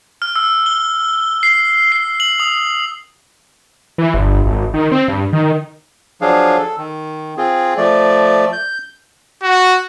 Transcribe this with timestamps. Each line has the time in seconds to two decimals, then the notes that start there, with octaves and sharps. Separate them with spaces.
0.22 F6
0.36 E6
0.66 G7
1.43 C7
1.92 C7
2.20 F#7
2.40 D#6
3.98 E3
4.14 G1
4.46 G#1
4.74 D#3
4.92 C4
5.08 G2
5.33 D#3
6.21 F3 F#3 D4 G#4 F5
6.58 A4
6.78 D#3
7.37 C4 F4 G#4
7.77 F3 A3 D5
8.53 G6
9.43 F#4